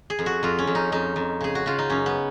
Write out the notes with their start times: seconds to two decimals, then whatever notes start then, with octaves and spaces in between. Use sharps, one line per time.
0.10 G#4
0.19 F2
0.26 F#4
0.43 F2 F4
0.58 C#4
0.67 F2
0.75 D#4
0.92 F2 D#4
1.16 F2
1.41 C#3 G#4
1.55 F#4
1.66 C#3 F4
1.79 D#4
1.90 F#2 C#4
2.06 B3